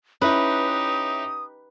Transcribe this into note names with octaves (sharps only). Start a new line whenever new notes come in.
C#4 D#4 E4 G4 B4 D#6